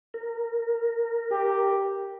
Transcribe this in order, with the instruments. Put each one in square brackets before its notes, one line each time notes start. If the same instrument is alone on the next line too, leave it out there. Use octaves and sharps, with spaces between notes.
[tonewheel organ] A#4
[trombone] G4